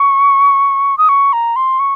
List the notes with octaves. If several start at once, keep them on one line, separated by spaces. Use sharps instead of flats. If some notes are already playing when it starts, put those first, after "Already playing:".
Already playing: C#6
D#6
C#6
A#5
C6
C#6